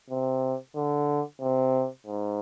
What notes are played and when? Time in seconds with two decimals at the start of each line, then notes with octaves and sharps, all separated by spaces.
0.10 C3
0.75 D3
1.41 C3
2.07 G#2